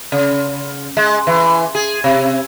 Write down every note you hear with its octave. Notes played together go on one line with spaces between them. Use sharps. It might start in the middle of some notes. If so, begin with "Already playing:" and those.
C#3
G#3
E3
G#4
C3